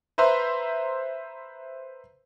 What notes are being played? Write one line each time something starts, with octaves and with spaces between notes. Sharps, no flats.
B4 C5 E5 A#5 C6